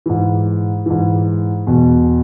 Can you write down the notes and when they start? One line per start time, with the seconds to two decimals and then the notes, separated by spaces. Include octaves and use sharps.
0.06 G#2 E3
0.86 G#2 E3
1.67 E2 B2